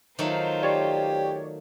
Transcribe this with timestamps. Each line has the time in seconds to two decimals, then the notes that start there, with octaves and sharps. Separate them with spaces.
0.19 D#3 F#3 A3 F4 C5
0.63 G4 C#5 D5